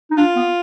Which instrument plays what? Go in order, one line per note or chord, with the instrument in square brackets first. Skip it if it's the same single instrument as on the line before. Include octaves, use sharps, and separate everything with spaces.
[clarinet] D#4
[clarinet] D4 [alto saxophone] F4
[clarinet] B3